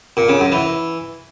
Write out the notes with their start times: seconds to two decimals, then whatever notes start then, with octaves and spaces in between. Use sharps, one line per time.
0.17 A#2
0.29 C#3
0.40 F#2
0.52 E3